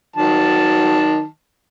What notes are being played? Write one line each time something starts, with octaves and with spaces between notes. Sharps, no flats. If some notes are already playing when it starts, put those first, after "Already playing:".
D#3 F#3 A5